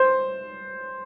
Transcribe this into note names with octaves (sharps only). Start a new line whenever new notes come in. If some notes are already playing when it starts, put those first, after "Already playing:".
Already playing: C5